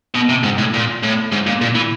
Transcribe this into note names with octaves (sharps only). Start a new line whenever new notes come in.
B2
C3
G#2
A2
A#2
A2
G#2
A#2
A#2
E3